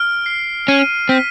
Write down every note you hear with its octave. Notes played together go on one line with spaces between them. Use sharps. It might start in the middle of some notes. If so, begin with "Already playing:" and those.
Already playing: F6 D7
C7
C#4 D#7
C4 B6